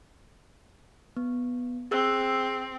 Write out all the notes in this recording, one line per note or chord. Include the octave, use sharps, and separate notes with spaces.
B3
C4 G#4 E6 F#6